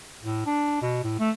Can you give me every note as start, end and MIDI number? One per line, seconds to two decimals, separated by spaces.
0.23 0.43 45
0.46 0.78 62
0.82 1.01 47
1.04 1.18 45
1.19 1.31 57